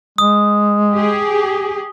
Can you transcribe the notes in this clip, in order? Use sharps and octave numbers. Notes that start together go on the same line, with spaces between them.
G#3 D#6
G4 G#4